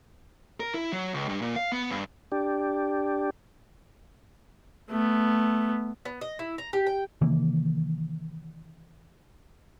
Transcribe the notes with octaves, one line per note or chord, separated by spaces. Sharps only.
A#4
E4
F#3
C#2
G2
A#2
F5
B3
G2
D4 G4
A3 B3
B3
D#5
E4
A#5
G4
G5
C3 D#3 E3 A#3